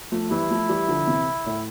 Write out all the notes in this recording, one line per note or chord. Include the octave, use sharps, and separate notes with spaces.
F3 A3
E3 G3 E4
F3 A3
E3 G3
D3 F3
C3 E3
A2